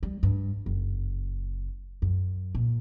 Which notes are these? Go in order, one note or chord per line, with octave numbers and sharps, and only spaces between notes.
G3
G2
F#1
F#2
A#2